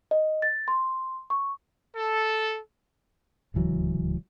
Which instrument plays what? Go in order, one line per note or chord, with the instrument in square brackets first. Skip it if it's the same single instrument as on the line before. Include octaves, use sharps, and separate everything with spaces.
[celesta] D#5
A6
C6
C#6
[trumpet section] A4
[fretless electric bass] D1 C#2 E3 F#3